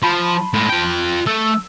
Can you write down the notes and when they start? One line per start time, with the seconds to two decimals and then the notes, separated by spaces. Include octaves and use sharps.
0.03 F3 A5 B5 C6
0.54 A2 G#3
0.69 F4 G5
1.27 A3 E6